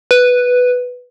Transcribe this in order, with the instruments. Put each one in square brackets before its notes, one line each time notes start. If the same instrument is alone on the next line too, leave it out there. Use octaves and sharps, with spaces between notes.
[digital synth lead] B4